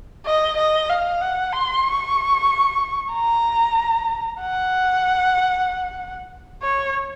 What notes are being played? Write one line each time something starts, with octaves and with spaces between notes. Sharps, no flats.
D#5
D#5
F5
F#5
C6
C#6
A#5
F#5
C#5